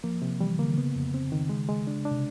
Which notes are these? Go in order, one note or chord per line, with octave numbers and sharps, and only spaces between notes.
F3 A#3
C3
E3 G3
D3 A#3
C#3 B3
F2
C4
D#3
G#3
G#3
D4
D4
C3